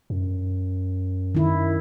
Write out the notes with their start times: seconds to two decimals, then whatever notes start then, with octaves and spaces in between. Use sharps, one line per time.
0.10 F#2
1.35 D#3 E4